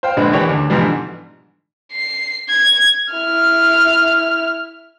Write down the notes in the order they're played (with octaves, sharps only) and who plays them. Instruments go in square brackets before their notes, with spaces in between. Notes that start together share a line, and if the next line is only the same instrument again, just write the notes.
[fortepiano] C5 F5 G5
A#1 D3 G#3 D4 B4
D#3 E3 D4 G4 B4 C#5
D2
G#2 B2 E3 F3 G3
D3
[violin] C7
G#6
[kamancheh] E4 F6